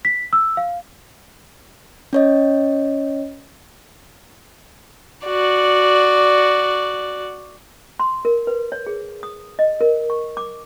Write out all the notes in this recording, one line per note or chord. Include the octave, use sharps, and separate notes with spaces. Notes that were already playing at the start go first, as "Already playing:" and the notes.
B6
E6
F5
C#4 C#5 D#5
F#4 D5
C6
A#4
B4
C#5
G#4
D#6
D#5
A#4
C#6
D6